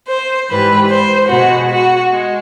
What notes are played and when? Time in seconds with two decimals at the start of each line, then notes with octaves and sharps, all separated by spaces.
0.09 C5
0.50 G#2 E3 G3 B4
0.91 C5
1.30 B2 G#3 F#4
1.71 F#4
2.10 G#3